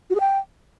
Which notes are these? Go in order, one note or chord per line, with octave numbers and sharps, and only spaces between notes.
F#4
G#4
G5